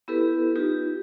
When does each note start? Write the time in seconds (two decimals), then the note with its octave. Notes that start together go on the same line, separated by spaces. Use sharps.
0.08 B3 E4 G4 A4 B4
0.56 D#4 F4 G4